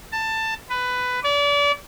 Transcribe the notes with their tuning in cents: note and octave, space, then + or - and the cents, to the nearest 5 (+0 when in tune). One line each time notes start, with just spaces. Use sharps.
A5 +15
B4 +15
D5 -35